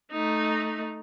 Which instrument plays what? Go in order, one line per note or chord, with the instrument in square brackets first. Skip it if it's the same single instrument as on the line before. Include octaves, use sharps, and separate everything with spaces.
[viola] A3 D#4